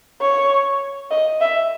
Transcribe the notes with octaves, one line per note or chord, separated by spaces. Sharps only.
C#5
D#5
E5